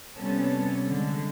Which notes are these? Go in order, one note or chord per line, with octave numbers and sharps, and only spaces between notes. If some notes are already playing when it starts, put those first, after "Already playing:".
C3 G3 B3 C#4 A4
D3 G#3